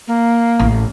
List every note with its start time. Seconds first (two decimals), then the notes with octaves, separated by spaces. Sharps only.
0.08 A#3
0.59 A1